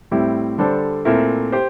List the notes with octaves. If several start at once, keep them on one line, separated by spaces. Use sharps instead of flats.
A2 G3 C4 E4 G4
D3 G3 D4 A4 C5
A#2 A3 C4 E4 A#4
G4 C5